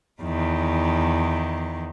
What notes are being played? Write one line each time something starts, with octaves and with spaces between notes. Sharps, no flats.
E2 D#3